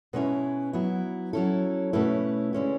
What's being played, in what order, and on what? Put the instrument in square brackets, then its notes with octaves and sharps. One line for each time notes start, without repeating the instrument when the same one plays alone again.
[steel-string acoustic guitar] B2 G#3 C#4 E4 B4
F#3 B3 E4
F#3 C#4 E4 A4
B2 A3 C#4 E4 B4
D3 G#3 C#4 E4